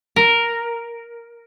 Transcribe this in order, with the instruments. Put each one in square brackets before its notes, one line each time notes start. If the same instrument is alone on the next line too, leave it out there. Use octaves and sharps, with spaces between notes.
[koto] A#4